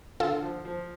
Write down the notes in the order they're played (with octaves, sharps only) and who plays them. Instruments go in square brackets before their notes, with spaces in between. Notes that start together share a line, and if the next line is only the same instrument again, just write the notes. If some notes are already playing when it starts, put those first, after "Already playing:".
[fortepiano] D3 [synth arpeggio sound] F4 A4
[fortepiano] F3
F3